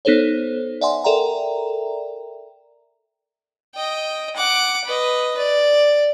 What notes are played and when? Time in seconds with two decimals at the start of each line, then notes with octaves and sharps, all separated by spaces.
0.05 B3 D#4 A4 C5 C#5
0.81 D5 E5 F#5 G#5 C6
1.04 A4 A#4 D5 E5 G5 A#5
3.75 D#5 G5
4.36 F#5 D6
4.84 B4 D#5
5.37 D5